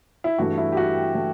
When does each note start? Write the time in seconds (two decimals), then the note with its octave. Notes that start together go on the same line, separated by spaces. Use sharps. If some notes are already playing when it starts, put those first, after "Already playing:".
0.24 E4
0.38 G2 E3 A3 F#4
0.58 E4
0.72 G4
0.77 F#4
1.14 E3 A3